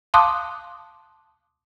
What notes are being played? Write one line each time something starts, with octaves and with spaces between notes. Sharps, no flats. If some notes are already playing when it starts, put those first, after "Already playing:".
F5 A5 C6 D6 D#6 F#6